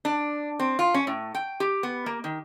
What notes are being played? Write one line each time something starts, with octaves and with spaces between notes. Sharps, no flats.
D4
C4
F4
C#4
A2
G5
G4
B3
A#3
D#3